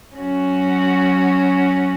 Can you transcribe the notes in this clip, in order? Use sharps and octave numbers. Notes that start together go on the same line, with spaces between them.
F#3 C#4 F#4